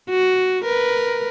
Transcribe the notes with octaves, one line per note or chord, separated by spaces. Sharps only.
F#4
A#4 B4